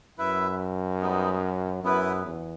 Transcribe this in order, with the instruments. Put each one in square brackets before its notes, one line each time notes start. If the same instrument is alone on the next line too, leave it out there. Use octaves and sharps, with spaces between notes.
[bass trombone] F#2 [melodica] E4 B4 E5
[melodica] G3 B3 D#4
[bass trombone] F#2 [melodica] B3 E4 B4
[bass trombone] E2